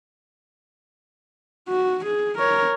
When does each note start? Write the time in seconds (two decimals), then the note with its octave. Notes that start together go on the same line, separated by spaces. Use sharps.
1.68 F#4
2.04 G#4
2.38 A#4 C#5